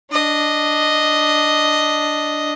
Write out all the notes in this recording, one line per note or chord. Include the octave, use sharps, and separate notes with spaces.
D4 D#5